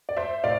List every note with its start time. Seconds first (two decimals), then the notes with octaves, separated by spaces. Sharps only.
0.09 D5
0.17 C5 E5
0.44 A2 D5 F5